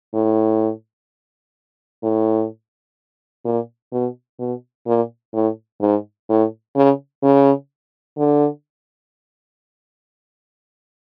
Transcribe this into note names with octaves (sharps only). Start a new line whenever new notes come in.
A2
A2
A#2
B2
B2
A#2
A2
G#2
A2
C#3
C#3
D3